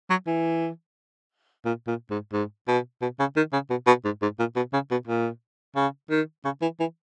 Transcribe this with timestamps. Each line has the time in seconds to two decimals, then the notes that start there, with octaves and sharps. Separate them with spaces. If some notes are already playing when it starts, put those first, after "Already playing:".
0.10 F#3
0.27 E3
1.65 A#2
1.87 A#2
2.10 G#2
2.33 G#2
2.68 B2
3.02 B2
3.19 C#3
3.37 D#3
3.53 C#3
3.70 B2
3.87 B2
4.05 G#2
4.22 G#2
4.39 A#2
4.56 B2
4.73 C#3
4.91 B2
5.07 A#2
5.76 C#3
6.10 D#3
6.45 C#3
6.62 E3
6.80 E3